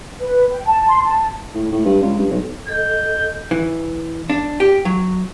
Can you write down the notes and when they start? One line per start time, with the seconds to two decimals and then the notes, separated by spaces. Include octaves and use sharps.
0.20 B4
0.51 G5
0.66 A5
0.88 C6
1.05 A5
1.55 A2
1.72 A2
1.85 G2
2.02 C#2
2.19 G2
2.31 B1
2.68 A4 D#5 G6
3.51 E3
4.30 D4
4.60 G4
4.85 F#3